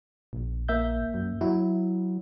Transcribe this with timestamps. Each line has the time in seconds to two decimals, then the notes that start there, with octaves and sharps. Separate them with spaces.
0.33 A#1
0.68 A#3 E5 G6
1.14 F#2
1.41 F#3 E4